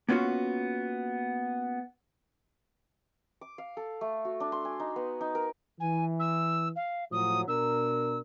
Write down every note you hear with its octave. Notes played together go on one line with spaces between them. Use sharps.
A#3 B3 C#4 F4 F#4
D6
F5
A4
A3
F#4
D4
C6
G#5
D#4
B3
D#4
A#4
E3 G#5
E6
F5
A2 F3 F#3 D#6
B2 D4 A#4 E6